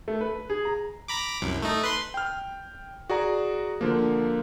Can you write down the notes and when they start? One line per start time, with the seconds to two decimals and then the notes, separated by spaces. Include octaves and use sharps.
0.08 A3
0.21 B4
0.49 G#4
0.65 A#5
1.08 A#5 B5 D6
1.41 C2 F#2
1.62 A3 D#4
1.83 B4 C6
2.14 G5 F6
3.10 F#4 G#4 D5 A#5
3.81 D3 F3 A#3